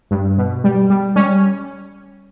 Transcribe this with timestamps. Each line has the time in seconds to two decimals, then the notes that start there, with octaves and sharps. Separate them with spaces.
0.11 G2
0.38 B2
0.64 G3
0.90 G3
1.16 G3 C#4